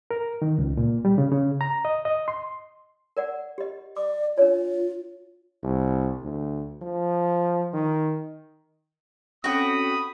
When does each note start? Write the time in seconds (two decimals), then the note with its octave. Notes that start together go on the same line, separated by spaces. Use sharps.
0.11 A#4
0.42 D#3
0.58 C#2
0.77 A#2
1.05 G3
1.18 C#3
1.32 C#3
1.61 A#5
1.85 D#5
2.05 D#5
2.28 C6
3.17 A#4 D5 F#5
3.58 G4 D#5
3.97 D5 D6
4.38 D4 F4 C#5
5.63 C2
6.22 D2
6.82 F3
7.74 D#3
9.44 C4 C#4 F#4 A4 G5 B5 D#6